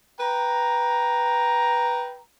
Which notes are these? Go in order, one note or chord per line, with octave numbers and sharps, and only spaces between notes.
B4 G5 A#5